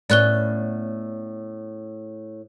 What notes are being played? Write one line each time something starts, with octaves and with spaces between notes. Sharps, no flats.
A2 B3 C#4 D5 F#6 G7